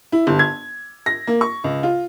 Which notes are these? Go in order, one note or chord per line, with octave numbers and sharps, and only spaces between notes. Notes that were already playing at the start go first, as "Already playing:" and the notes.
E4
G1
G#6
A#6
A#3
C#6
C#2
F4